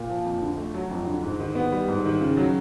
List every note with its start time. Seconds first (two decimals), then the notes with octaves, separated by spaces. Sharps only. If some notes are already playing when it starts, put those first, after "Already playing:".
Already playing: A#2
0.10 F3
0.25 F2
0.42 D3
0.57 A3
0.74 F#3
0.91 F2
1.07 D3
1.23 G#2
1.40 D#3
1.55 B3
1.72 G3
1.88 G#2
2.05 D#3
2.21 C#3
2.37 F#3